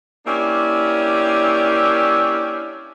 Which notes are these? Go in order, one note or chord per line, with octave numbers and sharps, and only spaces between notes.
A#3 C#4 D4 E4 G4